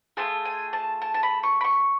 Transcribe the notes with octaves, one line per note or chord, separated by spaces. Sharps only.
A3 F4 G#4 A5
G#5
A5
A5
A5
B5
C#6
B5
C#6